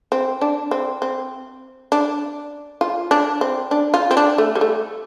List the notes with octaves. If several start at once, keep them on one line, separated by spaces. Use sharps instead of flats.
C4
D4
C4
C4
D4
F4
D4
C4
D4
F4
C4
D4
A3
G3
A3